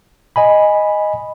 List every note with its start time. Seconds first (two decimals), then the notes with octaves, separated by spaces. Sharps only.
0.36 D#5 G#5 B5